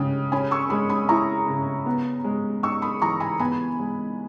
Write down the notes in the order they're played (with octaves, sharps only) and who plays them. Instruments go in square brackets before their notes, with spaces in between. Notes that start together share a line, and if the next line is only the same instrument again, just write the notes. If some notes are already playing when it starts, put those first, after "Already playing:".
Already playing: [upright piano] C#3 G#3 [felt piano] G5
[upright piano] C#4 [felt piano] G#5 B5
[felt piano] C#6 E6
[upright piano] G#3 [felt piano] B5 D#6
[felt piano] B5 D#6
[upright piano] E4 [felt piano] A#5 C#6
[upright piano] C#3
B3
G#3
[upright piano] D#4 [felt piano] C#6 E6
[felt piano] B5 D#6
[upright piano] E3 [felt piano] A#5 C#6
[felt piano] G#5 B5
[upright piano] B3 [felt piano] G#5 B5
[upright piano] G#3